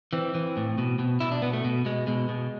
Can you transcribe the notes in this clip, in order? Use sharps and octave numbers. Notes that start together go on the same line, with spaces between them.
E3 C4
E3
A2
B2
B2
B2 E4
D4
B2 B3
A3
B2
B2 G#3
B2 G#3
B2